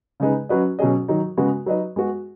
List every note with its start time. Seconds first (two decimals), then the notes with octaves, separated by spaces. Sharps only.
0.20 C#3 G#3 D#4 G#4 B4
0.49 F#3 C#4 F#4 B4 D#5
0.79 B2 F#3 C#4 G#4 D#5
1.08 D#3 F#3 D#4
1.37 C#3 G#3 B3 F#4
1.66 F#3 D#4 B4 D#5
1.96 G#3 B3 F#4